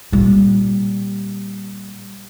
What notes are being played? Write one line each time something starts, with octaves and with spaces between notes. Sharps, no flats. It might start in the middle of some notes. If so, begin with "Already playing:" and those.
A#2 G3